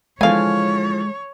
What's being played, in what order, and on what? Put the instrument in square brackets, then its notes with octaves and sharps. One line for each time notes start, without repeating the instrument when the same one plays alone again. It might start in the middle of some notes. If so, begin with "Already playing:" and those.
[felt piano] D3 E3 F3 [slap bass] G#3 [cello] C#5 [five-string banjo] F5 G#5